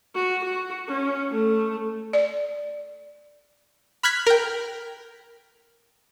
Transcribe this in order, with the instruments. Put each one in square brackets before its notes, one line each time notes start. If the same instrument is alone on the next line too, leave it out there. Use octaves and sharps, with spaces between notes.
[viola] F#4
F#4
C#4
A3
[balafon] D5
[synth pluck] B5 F6 F#6 G#6 B6
A#4 G5